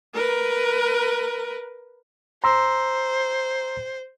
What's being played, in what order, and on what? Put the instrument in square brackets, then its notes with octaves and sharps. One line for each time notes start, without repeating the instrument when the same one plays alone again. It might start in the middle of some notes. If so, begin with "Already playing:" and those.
[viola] A#4 B4
[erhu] C5 [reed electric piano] A#5 C6 E6